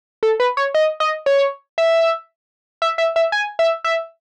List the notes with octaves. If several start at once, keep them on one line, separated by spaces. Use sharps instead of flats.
A4
B4
C#5
D#5
D#5
C#5
E5
E5
E5
E5
G#5
E5
E5